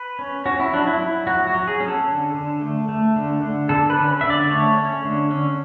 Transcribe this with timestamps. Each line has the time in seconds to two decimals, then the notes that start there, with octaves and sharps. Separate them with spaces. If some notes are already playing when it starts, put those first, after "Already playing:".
Already playing: B4
0.19 C#4
0.46 C#4 F#4
0.60 E4
0.73 F#3 D4
0.87 E4
1.01 F#3
1.27 F#3 F#4
1.47 F#4
1.54 F#3
1.67 G#4
1.80 C#4
1.88 A4
2.08 D3
2.34 D3
2.61 A3
2.89 A3
3.16 D3
3.42 D3
3.69 D3 A4
3.90 B4
3.96 C#4
4.21 D3 E5
4.30 D5
4.51 A3 C#5
4.77 C#4
5.05 D3
5.31 C#4